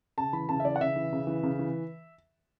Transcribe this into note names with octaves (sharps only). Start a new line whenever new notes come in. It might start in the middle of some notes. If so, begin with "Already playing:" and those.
C#3 A5
E3 B5
C#3 A5
E5
E3 D5
F#5
C#3 E5
E3
C#3
E3
C#3
E3